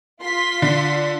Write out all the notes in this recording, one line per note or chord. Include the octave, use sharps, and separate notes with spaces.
F4 C6 B6
D3